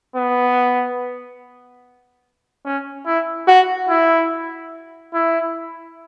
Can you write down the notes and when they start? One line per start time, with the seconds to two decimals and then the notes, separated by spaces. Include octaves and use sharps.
0.16 B3
2.65 C#4
3.06 E4
3.48 F#4
3.89 E4
5.14 E4